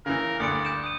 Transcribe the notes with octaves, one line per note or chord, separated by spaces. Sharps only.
C#3 E3 A#4
D2 G2 D5 D#6 C#7 D7
G6 D7 E7
D#6 D#7